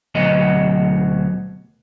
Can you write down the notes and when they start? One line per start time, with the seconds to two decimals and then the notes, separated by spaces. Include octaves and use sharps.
0.15 D2 B2 F#3 D#5